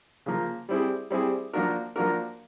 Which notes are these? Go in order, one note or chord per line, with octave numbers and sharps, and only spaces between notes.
C#3 F3 A#3
G3 C4 E4 G#4
G3 C4 E4 G#4
F3 A#3 D4 F#4 A#4
F3 A#3 D4 F#4 A#4